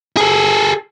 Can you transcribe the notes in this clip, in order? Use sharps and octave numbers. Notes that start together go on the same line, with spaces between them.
G#4 A4